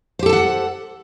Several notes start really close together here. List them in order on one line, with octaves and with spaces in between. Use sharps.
C5 G4 A4 A5 F#5